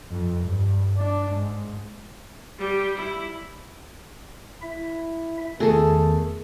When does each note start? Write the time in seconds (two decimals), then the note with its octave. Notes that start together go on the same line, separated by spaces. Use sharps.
0.11 F2
0.43 G2
0.97 D4
1.31 G#2
2.58 G3 G4
2.98 E4
4.62 E4 E5
5.60 E2 D#3 A3 G#4 A4